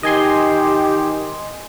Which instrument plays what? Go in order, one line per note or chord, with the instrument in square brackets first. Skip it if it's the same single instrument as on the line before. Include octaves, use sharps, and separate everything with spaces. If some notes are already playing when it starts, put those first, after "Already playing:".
[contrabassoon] D#3 [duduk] G4 [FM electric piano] D#5 G#5 C6